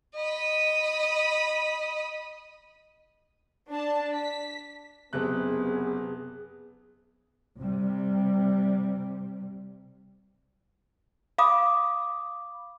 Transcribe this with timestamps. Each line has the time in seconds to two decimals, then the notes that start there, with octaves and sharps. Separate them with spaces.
0.16 D#5 B5
3.70 D4 A5
4.14 B6
5.13 F#1 C3 B3 G#4 F#6
7.59 C3 G3
11.38 F5 B5 D6 D#6